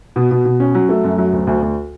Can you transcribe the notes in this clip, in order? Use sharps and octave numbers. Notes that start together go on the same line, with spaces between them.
B2
B2
B2
C#4
F#3
A3
F#2
F#3
D2
D2
D2